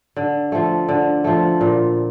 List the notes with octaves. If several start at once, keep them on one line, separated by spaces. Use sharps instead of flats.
D3
F3 A3
D3
F3 A3
A#2